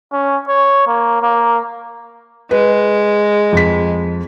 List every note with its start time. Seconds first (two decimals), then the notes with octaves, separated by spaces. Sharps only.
0.12 C#4
0.48 C#5
0.87 A#3
1.22 A#3
2.51 G#3 B4
3.53 F2 B6